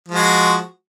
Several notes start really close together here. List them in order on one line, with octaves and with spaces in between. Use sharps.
F3 G#3 F#4